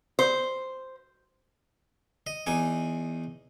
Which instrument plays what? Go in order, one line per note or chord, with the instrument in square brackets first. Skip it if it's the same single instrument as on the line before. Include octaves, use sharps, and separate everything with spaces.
[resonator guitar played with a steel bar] C5
[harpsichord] D#5
E2 D#4 G#5 D6